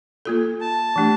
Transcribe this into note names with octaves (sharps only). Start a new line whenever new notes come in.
A#3 F4 A4
A5
E3 A3 D4 G4